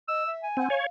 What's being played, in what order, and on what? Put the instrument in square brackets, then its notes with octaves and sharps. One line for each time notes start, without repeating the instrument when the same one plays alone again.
[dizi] D#5 [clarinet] E6
[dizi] E5
[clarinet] G#5
[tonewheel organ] C4 [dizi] F#5
[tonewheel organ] C#5 [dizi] F5